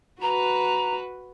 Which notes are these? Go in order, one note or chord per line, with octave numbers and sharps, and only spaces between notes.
F#4 B4 A#5